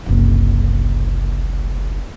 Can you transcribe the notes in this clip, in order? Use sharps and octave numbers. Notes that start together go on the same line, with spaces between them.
F#1 C2